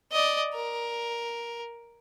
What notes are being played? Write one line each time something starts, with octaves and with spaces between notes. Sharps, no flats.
D5 D#5
A#4